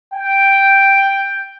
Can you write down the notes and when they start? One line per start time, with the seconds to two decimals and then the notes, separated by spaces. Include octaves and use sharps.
0.13 G5